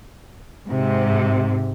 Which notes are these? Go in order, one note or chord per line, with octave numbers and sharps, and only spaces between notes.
G#2 C3